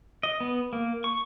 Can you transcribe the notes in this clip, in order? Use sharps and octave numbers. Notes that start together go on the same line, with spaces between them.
D#5
B3
A#3
C#6